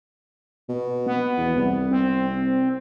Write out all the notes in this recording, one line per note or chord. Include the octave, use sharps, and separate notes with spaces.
B2
B3
E2
C2
C4